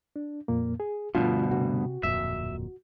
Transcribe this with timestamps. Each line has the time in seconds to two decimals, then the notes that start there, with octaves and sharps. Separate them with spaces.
0.16 D4
0.48 F2 A#2 A#3
0.80 G#4
1.15 D2 G2 B2 D3 D4 F4 F5
1.51 C3 F#4
2.03 D1 F2 A#2 E5